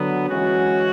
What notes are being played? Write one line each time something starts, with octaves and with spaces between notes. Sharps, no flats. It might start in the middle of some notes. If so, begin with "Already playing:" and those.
Already playing: D3 F#3 B3
E3 G#3 C#4 F#4